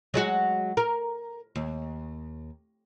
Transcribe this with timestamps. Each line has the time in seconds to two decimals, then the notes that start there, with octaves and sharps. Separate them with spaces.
0.14 F#3 G#3 F#4
0.77 A#4
1.56 D#2